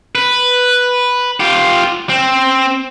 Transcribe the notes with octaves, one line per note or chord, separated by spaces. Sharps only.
B4
F4 G4
C4